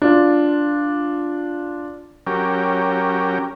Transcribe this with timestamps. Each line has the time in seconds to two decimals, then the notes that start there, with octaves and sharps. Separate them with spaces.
0.02 D4 F4
2.27 F#3 C#4 G4 A#4